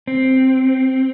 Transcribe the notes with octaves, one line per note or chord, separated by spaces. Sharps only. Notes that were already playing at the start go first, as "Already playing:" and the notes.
C4